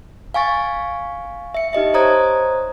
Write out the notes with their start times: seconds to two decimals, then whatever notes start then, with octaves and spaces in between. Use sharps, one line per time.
0.34 F5 G#5 C#6 A6
1.54 E5 C#7
1.73 D#4 G4 D#5 E5
1.94 C5 C#5 A#5 D#6 G#6